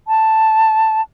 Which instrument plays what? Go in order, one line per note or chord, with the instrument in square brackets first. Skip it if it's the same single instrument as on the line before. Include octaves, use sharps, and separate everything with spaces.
[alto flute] A5